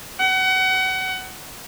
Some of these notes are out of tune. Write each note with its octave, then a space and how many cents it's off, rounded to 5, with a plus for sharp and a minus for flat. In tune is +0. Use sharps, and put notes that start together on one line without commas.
F#5 +30